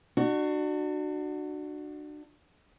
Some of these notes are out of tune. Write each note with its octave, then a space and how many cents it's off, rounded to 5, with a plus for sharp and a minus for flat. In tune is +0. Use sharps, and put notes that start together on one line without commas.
D4 +30 F#4 +0